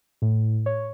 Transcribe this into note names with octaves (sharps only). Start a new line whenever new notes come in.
A2
C#5